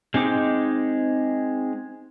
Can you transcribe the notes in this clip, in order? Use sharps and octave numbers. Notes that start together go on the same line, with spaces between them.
G#3 C4 D#4 D6